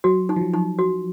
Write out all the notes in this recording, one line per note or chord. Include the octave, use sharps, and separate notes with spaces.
F#3 F#4
D#4
F3
F#3
D#4
F#4